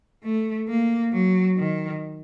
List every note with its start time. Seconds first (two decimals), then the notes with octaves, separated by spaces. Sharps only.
0.24 A3
0.68 A#3
1.13 F#3
1.57 D#3